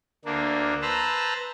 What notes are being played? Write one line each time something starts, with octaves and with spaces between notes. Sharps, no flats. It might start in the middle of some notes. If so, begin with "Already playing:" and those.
D2 A#3 D4
B4 C5 A5 A#5 E6